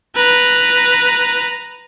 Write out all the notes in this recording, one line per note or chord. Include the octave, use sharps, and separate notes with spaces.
B4 A#5